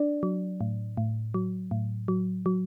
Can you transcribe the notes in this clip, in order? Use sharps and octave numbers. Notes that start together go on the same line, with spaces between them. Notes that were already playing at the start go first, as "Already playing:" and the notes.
Already playing: D4 D5
F#3
A2
A2
F#3
A2
F#3
F#3